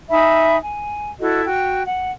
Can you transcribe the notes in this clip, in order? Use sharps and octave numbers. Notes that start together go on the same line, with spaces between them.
D#4 E5 G#5 B5
G#5
E4 F#4 A4 D#5
F#4 G5
F#5